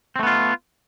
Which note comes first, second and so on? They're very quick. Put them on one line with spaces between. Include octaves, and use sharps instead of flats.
C4 A3 B3 F4